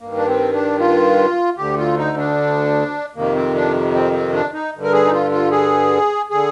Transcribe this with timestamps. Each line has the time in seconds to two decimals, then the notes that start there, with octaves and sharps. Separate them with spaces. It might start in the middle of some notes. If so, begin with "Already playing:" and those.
0.01 G2 D#3 A#3
0.16 D4
0.27 C4
0.53 D4
0.79 F4
1.58 D2 D3 G4
1.78 F4
1.98 D#4
2.17 D4
3.15 F2 C3 D#3 A#3
3.35 C4
3.55 D4
3.94 C4
4.13 C4
4.33 D4
4.53 D#4
4.73 G2 D3
4.83 A#4
4.92 G#4
5.05 D#4
5.12 F4
5.31 F4
5.51 G#4
6.30 D3 G#4